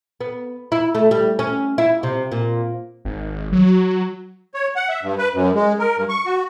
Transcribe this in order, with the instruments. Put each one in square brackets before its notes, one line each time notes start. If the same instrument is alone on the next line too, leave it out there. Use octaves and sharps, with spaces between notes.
[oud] B3
E4
A3
G3
C#4
E4
C3
A#2
[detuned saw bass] G#1
F#3
[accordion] C#5
F#5
E5
G2
B4
F#2
G#3
A#4
G2
C#6
F#4